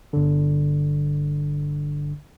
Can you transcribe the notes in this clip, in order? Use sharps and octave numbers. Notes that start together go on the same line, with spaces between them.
G1 D3